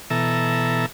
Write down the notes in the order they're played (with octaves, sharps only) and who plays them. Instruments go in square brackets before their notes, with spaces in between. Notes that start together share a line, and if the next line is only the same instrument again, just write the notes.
[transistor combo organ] B2 E3 A4 E5 A#5